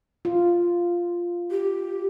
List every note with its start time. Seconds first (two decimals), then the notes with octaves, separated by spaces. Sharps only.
0.25 F4
1.51 G4